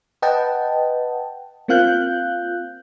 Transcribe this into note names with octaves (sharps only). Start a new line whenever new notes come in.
B4 D#5 F#5 G5 A5
A#3 C4 F4 F5 F#6 G6